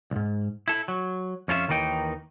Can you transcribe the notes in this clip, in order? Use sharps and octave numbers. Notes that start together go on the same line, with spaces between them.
C2 G#2
E4 A4
F#3
F2 C#4 F4 A4 E5
D#2 D#3 E3 D#4 G5